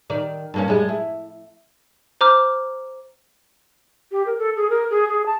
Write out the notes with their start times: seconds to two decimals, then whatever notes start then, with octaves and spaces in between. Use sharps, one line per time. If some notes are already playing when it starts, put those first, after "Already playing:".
0.10 D#3 D5
0.54 G2 A#3 C#4
0.68 F#2 G3 G#3
0.88 E4
2.21 C5 A#5 D6 F6
4.12 G4
4.26 A#4
4.39 A4
4.56 G#4
4.70 A#4
4.90 G#4
5.09 G#4
5.26 A5